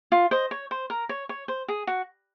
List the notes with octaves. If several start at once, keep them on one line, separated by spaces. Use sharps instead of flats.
F4
C5 D#5
C#5
C5
A#4
C#5
C#5
C5
G#4
F#4